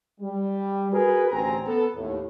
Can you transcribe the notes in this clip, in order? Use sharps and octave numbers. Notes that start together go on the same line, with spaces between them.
G3
F#4 G#4 A#4 B4
A1 D2 C4 G#5 A#5
B3 A4
D#2 A2